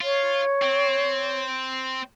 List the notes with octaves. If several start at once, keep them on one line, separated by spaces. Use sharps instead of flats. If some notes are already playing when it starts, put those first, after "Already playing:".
F4 C#5
C4